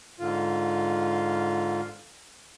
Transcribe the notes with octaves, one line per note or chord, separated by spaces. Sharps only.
G#2 D3 F4